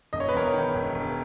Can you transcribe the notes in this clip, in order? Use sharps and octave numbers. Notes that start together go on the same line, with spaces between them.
E1 D#5
C#5
B4
E2 A#4 C#5
D#3
E1
E1